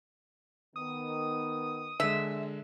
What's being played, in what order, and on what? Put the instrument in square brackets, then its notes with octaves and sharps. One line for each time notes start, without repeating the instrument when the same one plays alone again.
[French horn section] D#3 B3 [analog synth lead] D#6
[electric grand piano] D3 G#3 [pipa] E5